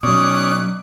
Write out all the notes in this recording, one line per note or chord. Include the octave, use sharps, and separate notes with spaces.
B2 F#3 C#4 D5 D#6 F#6